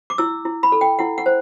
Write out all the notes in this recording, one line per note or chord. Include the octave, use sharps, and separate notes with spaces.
D6
E4 E6
E4
B5
A4
G5
E4 F#5
F#5
C5